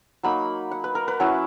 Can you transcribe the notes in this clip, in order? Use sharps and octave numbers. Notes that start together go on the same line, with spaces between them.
F#3 A#3 D#4 B5
F#5
B4
A#4
B4
F#3 C#4 E4